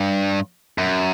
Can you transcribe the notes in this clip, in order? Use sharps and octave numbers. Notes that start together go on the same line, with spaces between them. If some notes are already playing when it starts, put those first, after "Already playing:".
Already playing: G2
F#2